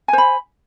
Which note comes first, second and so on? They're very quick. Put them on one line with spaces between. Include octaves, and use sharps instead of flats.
G#5 C5 B5